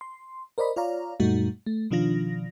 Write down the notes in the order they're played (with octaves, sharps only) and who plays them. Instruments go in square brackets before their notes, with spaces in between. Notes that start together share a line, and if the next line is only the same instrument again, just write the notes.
[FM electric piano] C6
A#4 C5 D5 D#5 B5
F4 C#5 D5 F5 A#5
F#2 A#2 G3 A3 D#4 F#4
A3
B2 D#3 F3 D4 F4 A#6